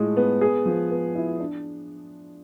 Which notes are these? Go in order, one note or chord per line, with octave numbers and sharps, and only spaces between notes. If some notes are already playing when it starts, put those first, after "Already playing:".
Already playing: A2 G#3 F4
B3
G#4
F3
B3
E4
D4